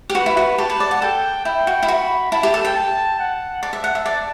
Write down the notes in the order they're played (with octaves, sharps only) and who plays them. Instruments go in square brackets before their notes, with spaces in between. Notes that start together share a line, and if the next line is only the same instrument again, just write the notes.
[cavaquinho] G4
[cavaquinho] F#4 [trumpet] B4
[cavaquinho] E4
F#4
[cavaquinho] G4 [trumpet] A5
[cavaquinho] B4
D5
F#5
[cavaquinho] A4 [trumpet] G5
[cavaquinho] E4 [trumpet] G5
[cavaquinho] F#4
E4
[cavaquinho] F#4 [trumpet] B5
[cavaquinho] E4 [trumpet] A5
[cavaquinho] G4
A4
G5
[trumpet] A5
F#5
[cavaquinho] D5 [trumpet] A5
[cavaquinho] E5
F#5
E5
D5